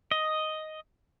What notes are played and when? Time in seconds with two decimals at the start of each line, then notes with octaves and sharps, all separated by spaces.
0.11 D#5